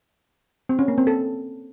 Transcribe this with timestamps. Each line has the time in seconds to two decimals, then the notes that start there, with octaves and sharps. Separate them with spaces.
0.69 C4
0.79 C#4
0.88 A#3
0.98 C4
1.07 A4